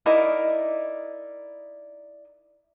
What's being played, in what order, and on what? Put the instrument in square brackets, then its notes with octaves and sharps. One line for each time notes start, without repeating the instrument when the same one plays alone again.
[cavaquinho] D#4 E4 A#4 D5